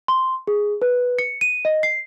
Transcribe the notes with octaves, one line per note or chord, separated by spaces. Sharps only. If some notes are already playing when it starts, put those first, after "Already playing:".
C6
G#4
B4
C#7
D#7
D#5
C7